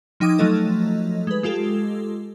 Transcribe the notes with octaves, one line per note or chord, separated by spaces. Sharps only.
F3 D#4 G5 D6 D#6 G#6
F3 F#3 A3 D#4 A4 D#5
G#3 B4
G#3 F4 G4 A4